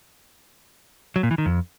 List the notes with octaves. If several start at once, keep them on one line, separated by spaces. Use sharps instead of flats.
F#3
A#2
E3
D#3
F2